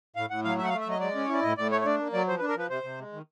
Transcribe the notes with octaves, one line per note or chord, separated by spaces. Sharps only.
A2 F5
A2 F#5
F#3 F5
A3 E5
F#5
F5
A3
E5
F#3 D#5
G#3 D5
C#4
E4 C#5
D5
A2 D#5
A2 D5
A3 C#5
C#5
D4 D5
A#3
F#3 D5
F3 C5
B4
D4
A#4
F3 B4
C3 C5
C3
G#3
D#3